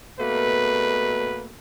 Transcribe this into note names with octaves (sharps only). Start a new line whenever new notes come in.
B2 A3 A#3 B4